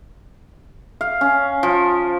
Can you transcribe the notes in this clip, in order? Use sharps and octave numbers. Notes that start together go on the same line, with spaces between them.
F5
C#4
F3